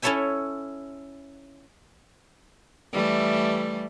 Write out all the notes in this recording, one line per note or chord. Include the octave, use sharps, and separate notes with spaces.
C#4 E4 A4 C#5 E5 G#5
E3 G3 A3